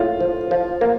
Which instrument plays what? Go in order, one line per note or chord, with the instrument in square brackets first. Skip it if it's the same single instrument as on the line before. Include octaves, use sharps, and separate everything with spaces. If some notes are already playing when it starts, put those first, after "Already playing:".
Already playing: [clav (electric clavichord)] A2 [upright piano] F4
[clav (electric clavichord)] F3
F3
A#3